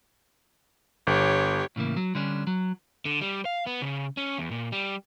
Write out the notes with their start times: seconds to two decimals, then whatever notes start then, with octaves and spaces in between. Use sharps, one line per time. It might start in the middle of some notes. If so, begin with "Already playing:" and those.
1.07 G1 G4 C#5
1.76 A2 C#3 E3 A#3
1.97 F#3
2.15 D3 G3 C#4 D4
2.47 F#3
3.05 D3
3.21 G3
3.45 F5
3.66 B3
3.82 C#3
4.17 C#4
4.38 E2
4.51 A#2
4.72 G3